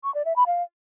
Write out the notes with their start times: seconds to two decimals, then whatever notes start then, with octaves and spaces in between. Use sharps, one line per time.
0.04 C#6
0.15 D5
0.25 E5
0.36 B5
0.47 F5